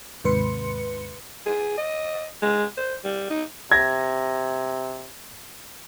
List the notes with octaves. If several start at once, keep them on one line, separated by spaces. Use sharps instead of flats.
D#2 G#2 C3 B4 C6 C#7
G#4
D#5
G#3
C5
G3
D#4
C3 G#6 A#6